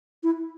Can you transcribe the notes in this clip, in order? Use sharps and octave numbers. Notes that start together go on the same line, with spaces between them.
E4